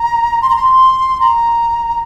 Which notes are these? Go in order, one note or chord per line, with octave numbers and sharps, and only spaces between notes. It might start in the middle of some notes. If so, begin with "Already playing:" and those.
Already playing: A#5
C6
A#5
C6
A#5